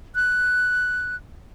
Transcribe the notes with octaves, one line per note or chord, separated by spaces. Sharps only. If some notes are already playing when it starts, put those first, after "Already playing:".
F#6